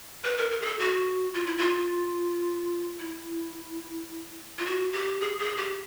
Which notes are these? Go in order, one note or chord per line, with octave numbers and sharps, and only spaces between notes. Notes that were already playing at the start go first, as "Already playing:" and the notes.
B4
A#4
A#4
G#4
A4
F#4
F4
E4
F4
E4
F4
F#4
G4
G#4
G#4
G4